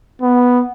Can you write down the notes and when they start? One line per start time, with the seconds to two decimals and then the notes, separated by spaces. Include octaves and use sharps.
0.21 B3